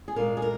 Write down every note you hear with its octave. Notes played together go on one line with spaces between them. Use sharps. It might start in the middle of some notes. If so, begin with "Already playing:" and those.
G#4
A#2 G#3 A#4
G#4
A#4